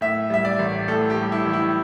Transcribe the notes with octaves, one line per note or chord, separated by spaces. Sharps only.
A2 E5
G3 E5
D5
A1
A2 A4
G4
G3
E4
A1
E4